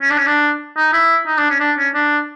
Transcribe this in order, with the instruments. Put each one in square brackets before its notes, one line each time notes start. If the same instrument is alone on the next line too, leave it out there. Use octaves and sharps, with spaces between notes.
[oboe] C#4
D4
C#4
D4
D#4
E4
D#4
D4
C#4
D4
C#4
D4